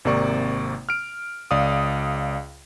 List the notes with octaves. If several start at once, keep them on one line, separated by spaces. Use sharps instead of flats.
G#1 C3 A#3 D5 C#6
F6 D7
C#2 D5 F5 D#6